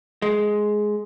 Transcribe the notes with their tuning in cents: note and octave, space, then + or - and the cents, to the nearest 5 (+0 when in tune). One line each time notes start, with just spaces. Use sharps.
G#3 +10